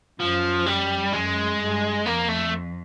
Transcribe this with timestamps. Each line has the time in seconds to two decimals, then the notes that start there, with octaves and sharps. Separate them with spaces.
0.20 F#2 F3
0.66 G3
1.13 F#2 G#3
1.60 G2
2.06 F2 A#3
2.29 A3